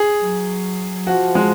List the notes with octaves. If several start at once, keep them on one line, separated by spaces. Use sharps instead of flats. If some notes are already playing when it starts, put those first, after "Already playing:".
Already playing: G#4
F#3
F3 F#4
G#3